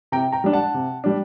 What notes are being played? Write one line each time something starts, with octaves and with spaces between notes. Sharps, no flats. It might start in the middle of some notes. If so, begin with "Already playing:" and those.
C3 G5 A#5
G5 A#5
G3 D4
F#5 A5
C3
G3 D4